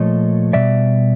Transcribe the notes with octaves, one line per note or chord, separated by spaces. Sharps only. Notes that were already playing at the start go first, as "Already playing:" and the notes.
Already playing: A#2 F3 A3 C#5 D#5
B2 G3 D5 E5